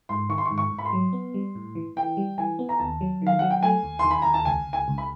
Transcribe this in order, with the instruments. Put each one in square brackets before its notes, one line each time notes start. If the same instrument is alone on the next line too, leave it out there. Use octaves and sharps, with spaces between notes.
[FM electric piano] G#2 [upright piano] C6
[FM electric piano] D#3 [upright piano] C#6
[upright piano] C6
C#6
[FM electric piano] G#2
[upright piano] C#6
[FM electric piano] G#2
[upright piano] B5
C6
[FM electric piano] F#3
B3
G3
A2
E3
[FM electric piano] E3 [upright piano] G5
[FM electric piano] G3
[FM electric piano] E3 [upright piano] G#5
[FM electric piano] B3
[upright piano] A#5
[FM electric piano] D#2 [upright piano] A5
[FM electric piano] F#3
[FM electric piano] D#3 [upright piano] F5
[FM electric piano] F#3 [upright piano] F#5
[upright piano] G5
[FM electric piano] A3 [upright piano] G#5
[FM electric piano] D#2
[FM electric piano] D#3 [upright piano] C6
[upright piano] B5
[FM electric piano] D#2 [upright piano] A#5
[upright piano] A5
[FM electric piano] C#2 [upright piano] G#5
[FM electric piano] C#2
[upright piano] G#5
[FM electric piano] C#2
[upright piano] B5